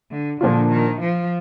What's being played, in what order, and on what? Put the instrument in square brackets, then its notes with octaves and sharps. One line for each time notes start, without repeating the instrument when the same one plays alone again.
[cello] D3
[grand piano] A#2 F3 A#3 D4 F4 [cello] D3
[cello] D#3
F3